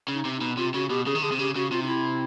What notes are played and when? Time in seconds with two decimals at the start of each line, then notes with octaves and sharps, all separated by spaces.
0.08 C#3
0.14 D#4
0.25 C3
0.36 B2 D#4
0.57 C3 F4
0.74 C#3 F#4
0.89 B2 G4
1.06 C#3 G#4
1.15 D#3
1.22 D3 G#4
1.32 C3
1.39 C#3 G4
1.55 C#3 F#4
1.71 C3 F4
1.82 D#4
1.87 E4